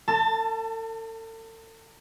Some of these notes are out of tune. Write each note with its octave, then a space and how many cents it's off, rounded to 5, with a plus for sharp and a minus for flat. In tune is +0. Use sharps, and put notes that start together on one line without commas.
A4 +40 A5 +10